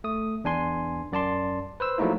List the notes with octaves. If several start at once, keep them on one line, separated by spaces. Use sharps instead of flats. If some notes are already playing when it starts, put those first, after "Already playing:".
A3 D#6
E2 D4 G#5 C6
F#2 D5 A5 C6
B4 C5 E6
F3 F#3 A3 A#3 D#4 E4